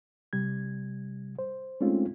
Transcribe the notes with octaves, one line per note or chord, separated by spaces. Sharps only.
C3 G3 G#6
C5
G#3 A3 C4 C#4 D#4 F4